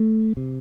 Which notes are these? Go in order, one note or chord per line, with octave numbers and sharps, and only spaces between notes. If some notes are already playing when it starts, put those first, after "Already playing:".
Already playing: A3
C3